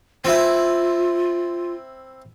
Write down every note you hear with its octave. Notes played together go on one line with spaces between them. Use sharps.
C4 E4 F4